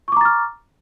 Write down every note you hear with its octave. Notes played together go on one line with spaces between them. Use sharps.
A#5 C#6 D6 F6 A6